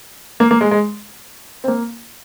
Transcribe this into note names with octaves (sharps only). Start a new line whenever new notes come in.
A#3
A#3
G#3
G#3
C4
A#3